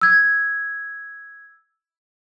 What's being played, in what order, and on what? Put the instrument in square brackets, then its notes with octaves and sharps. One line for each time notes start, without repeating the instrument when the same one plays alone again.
[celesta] E6 G#6